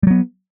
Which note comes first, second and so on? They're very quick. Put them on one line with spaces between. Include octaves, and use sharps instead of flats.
G3 F#3 B3